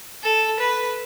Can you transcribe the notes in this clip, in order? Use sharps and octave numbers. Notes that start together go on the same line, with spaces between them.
A4
B4